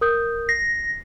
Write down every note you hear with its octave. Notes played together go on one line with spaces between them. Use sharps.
A#4 D#6 G6
A#6 C7